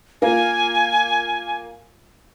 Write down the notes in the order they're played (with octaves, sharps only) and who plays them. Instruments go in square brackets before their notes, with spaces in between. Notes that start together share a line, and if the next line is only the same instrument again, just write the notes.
[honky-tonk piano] A#3 F4 A#4 [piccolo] G#5